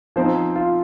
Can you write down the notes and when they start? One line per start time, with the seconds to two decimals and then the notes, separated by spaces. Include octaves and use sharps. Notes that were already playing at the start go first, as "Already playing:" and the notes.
0.16 F3 C4 D#4 C5
0.55 F4